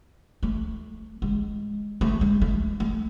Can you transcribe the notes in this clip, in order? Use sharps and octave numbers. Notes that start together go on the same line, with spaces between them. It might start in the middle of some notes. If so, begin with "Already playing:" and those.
A3
G#3
A3
G#3
A3
A3